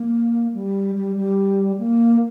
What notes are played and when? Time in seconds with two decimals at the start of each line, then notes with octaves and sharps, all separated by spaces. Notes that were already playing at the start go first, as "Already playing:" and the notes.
Already playing: A#3
0.53 G3
0.95 G3
1.15 G3
1.78 A#3